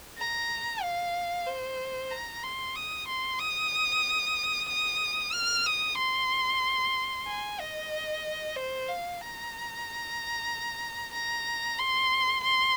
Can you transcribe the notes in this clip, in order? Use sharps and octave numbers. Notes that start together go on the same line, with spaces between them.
A#5
F5
C5
A#5
C6
D#6
C6
D#6
D#6
F6
D#6
C6
G#5
D#5
C5
F5
A#5
A#5
C6
C6